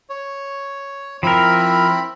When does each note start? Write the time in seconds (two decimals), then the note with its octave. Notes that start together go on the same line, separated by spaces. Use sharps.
0.10 C#5
1.23 F3 C4 E4 A#4 B5